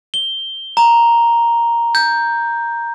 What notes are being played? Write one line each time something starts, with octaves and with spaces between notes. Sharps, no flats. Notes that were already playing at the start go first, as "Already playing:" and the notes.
G7
A#5
G6